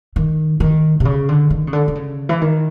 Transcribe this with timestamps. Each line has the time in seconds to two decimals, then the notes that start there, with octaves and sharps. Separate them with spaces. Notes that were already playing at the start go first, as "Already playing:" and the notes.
0.16 D#3
0.60 D#3
1.00 C3
1.05 C#3
1.29 D3
1.50 D#3
1.67 C#3
1.73 D3
1.88 D3
1.95 C#3
2.29 E3
2.41 D#3